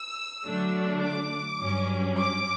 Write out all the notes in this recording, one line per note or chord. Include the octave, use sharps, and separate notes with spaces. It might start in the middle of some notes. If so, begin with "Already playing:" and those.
Already playing: E6
D3 F#3 A3 D4
D6
G2 F#3 C#4
D6